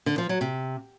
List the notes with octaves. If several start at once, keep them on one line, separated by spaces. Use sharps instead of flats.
D3
F3
F#3
C3